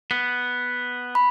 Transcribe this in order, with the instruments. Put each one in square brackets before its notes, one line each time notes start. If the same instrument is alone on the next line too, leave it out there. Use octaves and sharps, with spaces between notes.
[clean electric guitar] B3
[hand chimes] B5